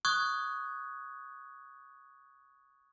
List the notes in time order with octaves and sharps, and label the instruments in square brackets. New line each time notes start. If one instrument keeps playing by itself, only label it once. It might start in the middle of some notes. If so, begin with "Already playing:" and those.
[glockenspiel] C#6 D#6 F#6 G#6